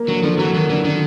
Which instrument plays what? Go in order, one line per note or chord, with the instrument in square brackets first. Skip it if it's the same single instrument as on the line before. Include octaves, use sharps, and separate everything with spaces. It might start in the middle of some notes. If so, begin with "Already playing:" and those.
Already playing: [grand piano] A#3
[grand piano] D3 [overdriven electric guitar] F#3
[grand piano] D3 [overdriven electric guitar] F3
[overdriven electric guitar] E3 [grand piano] F#3
[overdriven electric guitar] D#3 [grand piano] A#3
[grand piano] D3 [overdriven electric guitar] E3
[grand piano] D3 [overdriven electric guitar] D#3